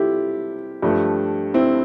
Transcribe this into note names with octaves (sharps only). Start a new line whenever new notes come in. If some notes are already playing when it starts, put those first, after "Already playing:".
Already playing: C3 G3 E4 F4 G4 A4
G2 F3 A3
C4 E4